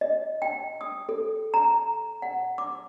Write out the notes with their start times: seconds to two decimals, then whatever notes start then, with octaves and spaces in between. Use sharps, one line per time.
0.01 D#5
0.42 G5
0.81 D#6
1.09 A4
1.54 A#5
2.22 F#5
2.58 D6